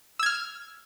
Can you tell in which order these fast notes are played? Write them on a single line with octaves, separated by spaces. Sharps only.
E6 G#6 F6